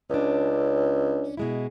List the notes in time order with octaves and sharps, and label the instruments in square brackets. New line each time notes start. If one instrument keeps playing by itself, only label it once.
[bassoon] C#2 [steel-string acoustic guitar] C#4 D4
[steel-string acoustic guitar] B2 G#3 E4